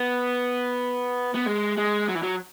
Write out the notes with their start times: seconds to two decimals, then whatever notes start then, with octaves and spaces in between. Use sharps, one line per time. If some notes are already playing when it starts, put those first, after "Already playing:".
Already playing: B3
1.35 B3
1.47 G#3
1.78 G#3
2.09 F#3
2.15 E3
2.23 F#3